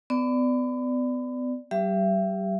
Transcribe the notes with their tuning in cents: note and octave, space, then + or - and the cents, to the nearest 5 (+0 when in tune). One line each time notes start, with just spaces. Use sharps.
B3 +35 D5 +0
G3 -45 G4 +20 E5 +35